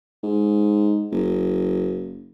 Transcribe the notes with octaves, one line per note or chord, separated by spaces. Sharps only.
G#2
F#1